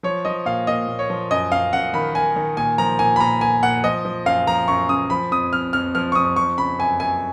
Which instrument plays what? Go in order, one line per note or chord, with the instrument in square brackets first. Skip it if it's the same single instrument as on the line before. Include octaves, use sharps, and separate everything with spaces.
[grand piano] F3 C#5
F3 D#5
A#2 F5
A#2 D#5
A#2
C#5
F3
F#2 D#5
F#2 F5
F#2 F#5
D#3 B5
D#3 G#5
D#3
A#2 G#5
F3 A#5
A#2 G#5
B5
A#2 A#5
A#2 G#5
A#2 F#5
F3 D#5
F3
F#2 F5
F3 A#5
F#2 C#6
C#3 D#6
F3 B5
F2 D#6
F2 F6
F2 F6
F3 F6
C#6
F2 D#6
F3 C#6
C#3 B5
F#2 G#5
F#2 G#5